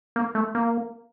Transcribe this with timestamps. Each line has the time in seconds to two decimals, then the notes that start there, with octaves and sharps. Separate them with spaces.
0.16 A#3
0.35 A3
0.55 A#3